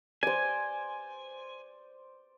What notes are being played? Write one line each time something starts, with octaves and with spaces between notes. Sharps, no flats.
C5 D5 G#5